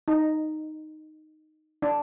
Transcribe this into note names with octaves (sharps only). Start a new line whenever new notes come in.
D#4
D4